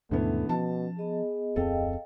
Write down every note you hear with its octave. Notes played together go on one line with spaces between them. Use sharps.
D#2 G#2 B2 D3 E3 A3 B3 C#4
B2 F3 A5
B3 G#4 D#5
D1 F2 C4 A4 D#5 F5 G5